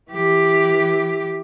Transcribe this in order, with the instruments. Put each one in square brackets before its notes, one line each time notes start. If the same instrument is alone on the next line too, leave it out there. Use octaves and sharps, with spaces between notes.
[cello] E3 G4